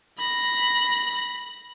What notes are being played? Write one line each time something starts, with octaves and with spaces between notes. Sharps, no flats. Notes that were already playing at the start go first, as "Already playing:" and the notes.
B5 A#6